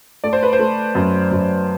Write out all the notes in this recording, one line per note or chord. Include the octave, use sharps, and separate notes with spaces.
A3 D5
C5
B4
C5
A3
F#2
F#2